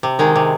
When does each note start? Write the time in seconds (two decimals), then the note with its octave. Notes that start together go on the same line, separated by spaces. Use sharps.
0.03 C3
0.19 D#3 G#3
0.36 C3